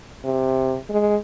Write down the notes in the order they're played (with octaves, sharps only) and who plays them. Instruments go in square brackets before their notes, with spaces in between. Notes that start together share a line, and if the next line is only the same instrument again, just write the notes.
[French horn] C3
G#3